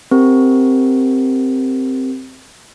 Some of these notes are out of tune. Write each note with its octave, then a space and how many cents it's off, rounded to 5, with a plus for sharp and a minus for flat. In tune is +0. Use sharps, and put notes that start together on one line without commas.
C4 +0 G4 +0 A#4 +0